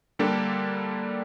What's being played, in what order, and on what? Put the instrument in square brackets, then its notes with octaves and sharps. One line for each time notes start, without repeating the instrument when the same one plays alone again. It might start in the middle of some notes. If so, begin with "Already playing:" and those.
[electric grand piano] D3 G3 A#3 D4 G4 A4